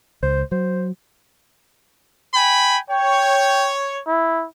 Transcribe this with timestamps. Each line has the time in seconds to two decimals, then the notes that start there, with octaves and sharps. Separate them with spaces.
0.23 C#2 C5
0.51 F#3 C5
2.35 G5 G#5 B5
2.90 C#5 G5
4.07 E4